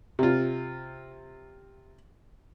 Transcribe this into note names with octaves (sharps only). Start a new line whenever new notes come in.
C3 F4